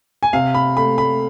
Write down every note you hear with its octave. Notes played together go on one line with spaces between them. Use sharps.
G#5
C3 F5
B5
A3 B5
B5